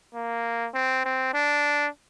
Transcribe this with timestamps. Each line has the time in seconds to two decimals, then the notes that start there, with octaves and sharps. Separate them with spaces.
0.14 A#3
0.74 C4
1.05 C4
1.34 D4